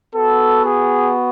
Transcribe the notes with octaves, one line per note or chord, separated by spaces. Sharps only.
B3 F#4 A4
G#4